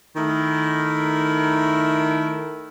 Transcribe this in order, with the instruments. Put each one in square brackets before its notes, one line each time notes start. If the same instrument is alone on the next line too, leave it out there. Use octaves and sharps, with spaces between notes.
[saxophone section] D#3 A3 E4 A#4